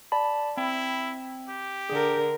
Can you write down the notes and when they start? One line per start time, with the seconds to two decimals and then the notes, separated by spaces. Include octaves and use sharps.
0.12 D5 A5 B5
0.57 C4 E4
1.48 G4
1.90 D3 G#4 A#4